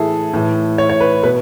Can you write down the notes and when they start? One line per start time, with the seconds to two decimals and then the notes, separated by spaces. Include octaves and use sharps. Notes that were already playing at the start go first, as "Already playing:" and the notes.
Already playing: A2 E3 E4 G#4 A4
0.33 A2 E3
0.78 C#5
0.89 C#5
1.00 B4
1.23 B2 B4